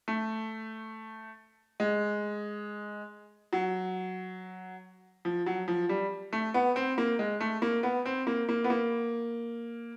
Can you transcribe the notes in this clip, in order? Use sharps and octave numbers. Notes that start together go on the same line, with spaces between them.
A3
G#3
F#3
F3
F#3
F3
G3
A3
B3
C4
A#3
G#3
A3
A#3
B3
C4
A#3
A#3
B3
A#3